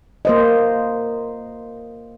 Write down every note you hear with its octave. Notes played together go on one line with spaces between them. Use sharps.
A#3 C5 D#5